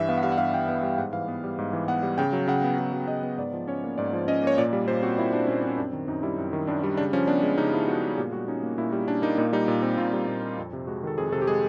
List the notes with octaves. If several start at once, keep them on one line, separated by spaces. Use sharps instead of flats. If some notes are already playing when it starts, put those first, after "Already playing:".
Already playing: G2 E3 E5
B3 F5
F#5
G3 F5
F#5
G2 F5
E3 G5
B3 F#5
G3
G#2 F#5
E3 F5
B3
G3
G#2
E3
B3 F#5
G3
C#3 G5
F#3
C#3 F#5
B3
C#3
F#3
C#3 D#5
B3
G#2 D5
F3
C#4 C#5
A#3
G#2 D5
F3
C#4 D#5
A#3 C#5
A#2 D5
G3
A#2 C5
C4 F#4
A#2 E4
G3 D4
A#2 C#4
C4 C#4
F#2 D4
D#3
F#2 D#4
G3 E4
F#2
D#3
F#2 D4
G3
C#3 D4
F3 C#4
B3 D4
G#3
C#3 D#4
F3 E4
B3 F#4
G#3
A#2 G4
G3 F#4
C#4 D#4
A#3
A#2 E4
G3
C#4 D4
A#3 D#4
A#2 D#4
G3 D#4
A#2
C4
A#2 F4
G3
A#2
C4
F2
C3
G#3 F#4
D#3 A4
F2 G#4
C3 A4
G4
G#3 G#4